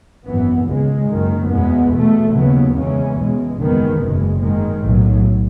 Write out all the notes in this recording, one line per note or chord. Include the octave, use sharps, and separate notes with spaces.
G#1 F#2 E3 B3
C#2 C#3 G#3
F#1 F#2 D#3
E2 B2 G#3 B3
E2 B2 A3
D#2 C#3 F#3 B3
E2 C#3 E3 G#3 C#4
E2 B2 G#3
F#1 E2 D#3 G#3 B3
F#1 E2 B2 G#3
G#2 D#3 G#3
B1 A2 F#3